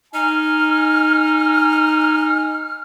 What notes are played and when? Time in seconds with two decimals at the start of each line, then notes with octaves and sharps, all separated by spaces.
0.14 D#4 G#5 F6